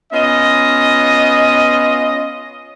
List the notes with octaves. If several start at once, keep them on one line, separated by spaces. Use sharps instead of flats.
B3 C#4 F4 D#5